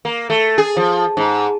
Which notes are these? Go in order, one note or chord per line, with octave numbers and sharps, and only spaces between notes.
A#3
A3
G#4
F3
G#2